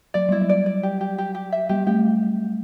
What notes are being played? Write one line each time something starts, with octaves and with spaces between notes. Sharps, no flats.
F#3 D5
G3 E4
F#3
D5
D5
G4
G4
G4
G4
E5
G3 G4
A3 G4